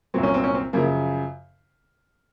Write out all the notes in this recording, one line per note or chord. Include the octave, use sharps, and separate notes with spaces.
C2 A#2 F#3 C4
C#4
C4
C#4
C4
F#2 C#3 F3 A#3